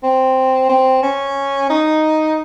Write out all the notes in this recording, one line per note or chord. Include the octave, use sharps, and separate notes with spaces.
C4
C4
C#4
D#4